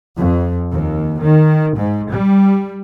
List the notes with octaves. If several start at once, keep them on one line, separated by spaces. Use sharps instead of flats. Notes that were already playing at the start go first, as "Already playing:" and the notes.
F2
D#2
D#3
G#2
G3